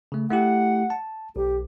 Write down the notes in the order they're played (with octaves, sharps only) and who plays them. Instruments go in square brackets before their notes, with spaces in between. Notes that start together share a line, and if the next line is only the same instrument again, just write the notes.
[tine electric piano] C#3 A3
[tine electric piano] A3 E4 G4 [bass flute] F#5
[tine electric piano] A5
[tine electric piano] B1 [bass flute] G4